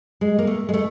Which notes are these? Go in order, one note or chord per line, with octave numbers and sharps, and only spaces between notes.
G#3
A#3
A3
G#3
A3